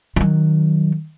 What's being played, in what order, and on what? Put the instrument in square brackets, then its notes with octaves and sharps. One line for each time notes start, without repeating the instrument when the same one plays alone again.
[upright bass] D#3 F#3